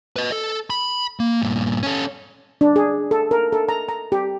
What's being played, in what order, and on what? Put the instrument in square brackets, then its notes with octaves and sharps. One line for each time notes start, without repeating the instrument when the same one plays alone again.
[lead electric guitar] B4 D#5
A4
B5
A#3
G2 A#2
C#4 A4
[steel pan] D4
G#4
A4
A#4
A4
A#5
A#5
G4